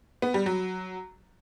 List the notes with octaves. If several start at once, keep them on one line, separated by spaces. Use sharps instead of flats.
B3
G3
F#3